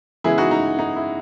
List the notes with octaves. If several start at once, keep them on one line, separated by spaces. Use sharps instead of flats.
C#3 E3 G#3 B3 E4 G#4
D#4 F#4
D#4
D#4
E4